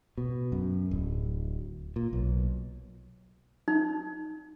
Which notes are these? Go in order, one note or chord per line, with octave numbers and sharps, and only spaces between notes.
B2
F#2
D1
A#2
B1
D#4